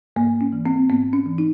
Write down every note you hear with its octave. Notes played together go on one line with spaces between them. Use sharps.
G#2 A#3
C#4
E3
C4
G#2 B3
C#4
E3
D#4